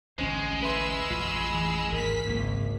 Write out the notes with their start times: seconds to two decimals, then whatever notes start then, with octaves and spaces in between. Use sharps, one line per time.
0.18 A1 D2 G#3 C#4 C5
0.63 B4 E5 B5 C6 E6
1.10 A1 F2 F4
1.54 E3
1.92 G#1 D#2 A#4 B6
2.27 G#1 C#2 G#2 A#3